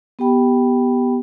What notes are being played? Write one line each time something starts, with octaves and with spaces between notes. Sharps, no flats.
B3 G4 G5 B5